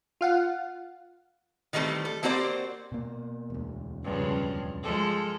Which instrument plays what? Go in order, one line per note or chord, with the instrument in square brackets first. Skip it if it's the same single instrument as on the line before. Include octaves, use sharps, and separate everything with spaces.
[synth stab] F4 F5 F#5
[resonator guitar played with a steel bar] D#3 E3 G3 A3 C4
A4
A#3 C4 F#4 G4 C5 D5
[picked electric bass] B2 A#3
E1 D2
[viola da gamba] G2 C#3 F3
F3 G#3 A4